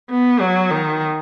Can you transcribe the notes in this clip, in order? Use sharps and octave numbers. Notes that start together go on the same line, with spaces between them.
B3
F#3
D#3